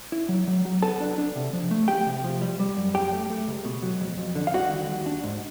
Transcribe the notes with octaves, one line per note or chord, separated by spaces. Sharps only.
E4
F#3
F#3
F#3
B3 A4 A5
D4
D4
C3
F3
A3
F3 G4 G5
C3
F3
G3
G3
F#2
F#2 G4 G5
A3
A3
C#2
B2
F#3
F2
F2
D3
F5
G3 F#4 F#5
D#3
D#2
D4
G#2